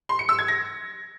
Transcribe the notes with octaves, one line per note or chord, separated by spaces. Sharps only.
C6
C#7
E6
G#6
A#6